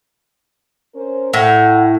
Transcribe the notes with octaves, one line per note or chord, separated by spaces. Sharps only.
C#4 A#4 C5
A2 F#5